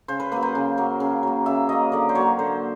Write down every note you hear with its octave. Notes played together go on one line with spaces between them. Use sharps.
C#3 C5
B4
F#3 A#3 B4
C5
C#3
F#3 A#3
C#3
F#3 A#3
C#3 E5
F#3 A#3 D#5
D3 D5
C5
F#3 A#3 C#5
D3 C5